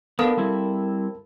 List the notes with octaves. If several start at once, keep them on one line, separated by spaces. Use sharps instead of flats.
B3 D4 A4 A#4 F5 A5 B5 D#6
G3 C4 E4